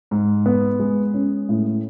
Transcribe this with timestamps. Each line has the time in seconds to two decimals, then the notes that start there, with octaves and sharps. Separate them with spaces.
0.11 G#2
0.46 B3
0.79 G#3
1.14 C#4
1.49 A2